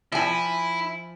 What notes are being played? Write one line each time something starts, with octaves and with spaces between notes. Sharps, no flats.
F3 E4 G#5